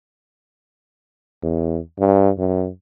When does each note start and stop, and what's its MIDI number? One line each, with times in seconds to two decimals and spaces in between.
1.43 1.79 40
1.99 2.30 43
2.38 2.69 42